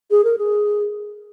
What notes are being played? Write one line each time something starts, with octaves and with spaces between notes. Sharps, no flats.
G#4
A#4
G#4